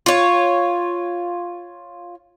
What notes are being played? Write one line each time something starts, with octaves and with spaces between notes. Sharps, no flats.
F4 C#5